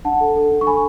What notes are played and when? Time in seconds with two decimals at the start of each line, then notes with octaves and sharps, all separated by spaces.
0.05 D4 F#5 A5
0.21 A4
0.36 A4
0.51 D4
0.61 C#6
0.67 A4 G#5 B5